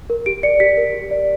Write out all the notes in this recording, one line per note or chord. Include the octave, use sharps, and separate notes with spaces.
A#4
G4 D7
D5 C#7
G4 B6
A#4
G4
D5